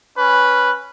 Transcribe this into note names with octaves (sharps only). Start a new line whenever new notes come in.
C#4 B4